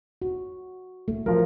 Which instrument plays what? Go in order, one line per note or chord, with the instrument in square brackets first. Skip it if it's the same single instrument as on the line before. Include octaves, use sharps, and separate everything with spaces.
[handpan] F#4
A3
[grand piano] F3 A#4 [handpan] F#3